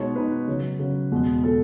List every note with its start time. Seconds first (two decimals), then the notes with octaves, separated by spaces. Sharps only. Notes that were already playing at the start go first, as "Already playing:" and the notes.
Already playing: B2 G#3 D#4 C#5
0.15 B2 G#3 D#4 B4
0.48 C#3 F#3 C#4
0.79 C#3 F#3 C#4
1.12 E2 B2 G#3
1.44 B2 G#3 A4